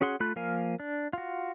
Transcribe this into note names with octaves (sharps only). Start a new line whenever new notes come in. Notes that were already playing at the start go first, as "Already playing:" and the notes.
C#4 F#4 G#4 F#5 C6
A3 F4 B5 F#6
F3 A#3 A#4 F5 G#5
D4
F4 F#4